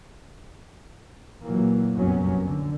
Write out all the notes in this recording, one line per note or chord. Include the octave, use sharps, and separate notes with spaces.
A#2 E3 F#3 A#3
F1 C2 F#2 F#3 B3 C#4
D3